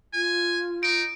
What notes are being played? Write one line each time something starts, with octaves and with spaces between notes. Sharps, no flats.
F4 G#5
D#4 D7